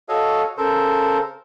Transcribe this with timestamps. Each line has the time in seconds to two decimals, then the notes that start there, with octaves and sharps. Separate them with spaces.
0.09 F#4 A4 C#5 D#5 F5
0.57 C#3 A4 A#4 C5